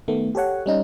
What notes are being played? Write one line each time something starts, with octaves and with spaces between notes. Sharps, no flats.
D#3 A3 B3
G4 A4 C#5 F#5
G3 C#4 D#4